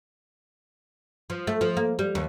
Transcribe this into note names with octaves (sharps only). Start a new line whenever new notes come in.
F3
A3
F3
A#3
G3
D#2